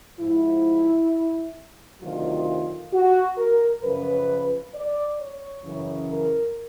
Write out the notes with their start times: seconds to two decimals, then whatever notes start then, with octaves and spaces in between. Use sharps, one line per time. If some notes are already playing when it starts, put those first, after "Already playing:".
0.19 G#2 F3 E4
2.01 D2 C3 D#3 F#3 F4
2.93 F#4
3.38 A#4
3.83 F#2 C#3 F3 B4
4.75 D5
5.20 C#5
5.65 F#2 C#3 E3
6.12 A#4